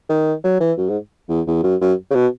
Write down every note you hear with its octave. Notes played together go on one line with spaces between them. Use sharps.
D#3
F#3
E3
F#2
G#2
E2
E2
F#2
F#2
C#3
B2